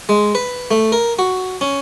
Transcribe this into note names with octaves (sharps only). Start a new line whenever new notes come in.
G#3
B4
A3
A#4
F#4
C#4